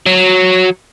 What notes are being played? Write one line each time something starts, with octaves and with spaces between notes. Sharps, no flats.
F#3